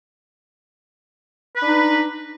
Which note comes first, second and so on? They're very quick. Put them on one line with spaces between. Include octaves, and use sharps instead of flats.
B4 D4 D#4